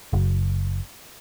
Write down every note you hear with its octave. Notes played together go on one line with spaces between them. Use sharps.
F#1